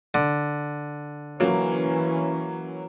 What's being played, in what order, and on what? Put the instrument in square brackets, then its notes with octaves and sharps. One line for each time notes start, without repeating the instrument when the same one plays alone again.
[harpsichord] D3
[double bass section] E3 C#4 [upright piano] F#3 A#3